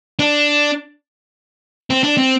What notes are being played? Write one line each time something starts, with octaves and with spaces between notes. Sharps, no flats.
D4
C4
D4
C4